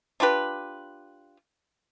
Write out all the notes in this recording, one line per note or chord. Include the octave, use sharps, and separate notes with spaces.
D4 F4 G4 B4